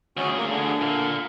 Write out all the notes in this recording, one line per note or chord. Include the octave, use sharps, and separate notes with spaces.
D2 C#4 F#4 G#4
A#3
D3
A#2 A#3